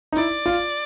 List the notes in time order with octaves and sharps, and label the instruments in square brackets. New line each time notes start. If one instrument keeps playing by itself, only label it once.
[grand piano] D#4
[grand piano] E4 [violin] D5
[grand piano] F4